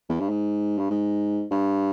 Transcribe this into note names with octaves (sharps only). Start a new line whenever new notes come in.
E2
G2
G#2
G2
G#2
G2